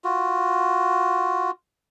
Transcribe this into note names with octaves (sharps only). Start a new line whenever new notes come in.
F4 F#4